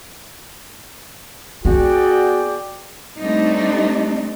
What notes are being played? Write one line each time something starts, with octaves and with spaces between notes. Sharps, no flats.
B3 F#4 G#4 D5 G5
G3 A3 C4 D4 D#4